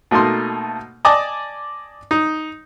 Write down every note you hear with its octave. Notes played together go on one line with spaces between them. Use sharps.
B2 A3 A#3 D#4 C6
D5 D#5 G#5 A5 D6
D#4